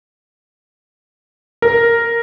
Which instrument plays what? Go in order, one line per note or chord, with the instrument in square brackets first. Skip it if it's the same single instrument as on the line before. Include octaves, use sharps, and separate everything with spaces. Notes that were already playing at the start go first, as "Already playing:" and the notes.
[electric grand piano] A#4